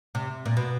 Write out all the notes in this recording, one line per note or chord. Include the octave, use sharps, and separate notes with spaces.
C3
A#2
B2